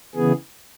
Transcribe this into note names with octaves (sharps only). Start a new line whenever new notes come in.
C#3 E3 B3 G#4